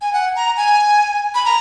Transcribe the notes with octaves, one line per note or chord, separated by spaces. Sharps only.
G#5
F#5
A#5
G#5
B5
A#5